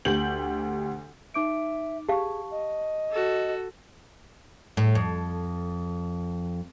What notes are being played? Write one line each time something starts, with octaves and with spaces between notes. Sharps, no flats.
D2 G4 G6 F#7
D#4 E5 D6 D7
G4 G#4 F5 A5 C#6
D#5
F#4 A4
A2
F2